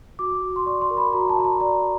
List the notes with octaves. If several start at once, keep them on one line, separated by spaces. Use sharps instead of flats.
F#4 D6
F#4
C6
D5 C#6
C6
A#4
B5
F#4 A#5
A5
F#4 A#5
A5
D5 A#5